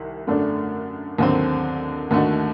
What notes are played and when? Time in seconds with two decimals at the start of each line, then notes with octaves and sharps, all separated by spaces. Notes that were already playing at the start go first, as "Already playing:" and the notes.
Already playing: C2 C3 D#3
0.27 F#2 D3 A3 D4
1.18 D#2 D3 F#3 C4
2.11 D#2 D3 A3 D#4 F#4